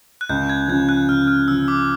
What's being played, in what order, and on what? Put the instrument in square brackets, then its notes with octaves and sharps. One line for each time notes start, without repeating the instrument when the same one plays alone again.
[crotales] F#6
[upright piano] C#2 [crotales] G6
[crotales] G#6
[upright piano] C#3 F3 [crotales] G6
[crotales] F#6
[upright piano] C#2 [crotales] F6
[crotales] F6
[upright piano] C#3 F3 [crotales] E6
[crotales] D6